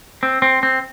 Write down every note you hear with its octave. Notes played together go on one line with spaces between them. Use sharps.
C4
C4
C4